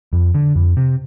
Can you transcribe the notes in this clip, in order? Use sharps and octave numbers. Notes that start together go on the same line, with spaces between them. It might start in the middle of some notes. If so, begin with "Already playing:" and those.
F2
D3
F2
C3